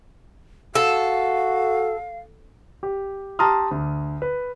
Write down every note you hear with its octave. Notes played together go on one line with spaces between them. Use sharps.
F#4 A4 F5
G4
G4 A5 A#5 C6 D#6 F6
D2
B4